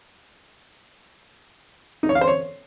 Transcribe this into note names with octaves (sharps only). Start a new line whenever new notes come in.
D#4
C#5
F5
C5
C#5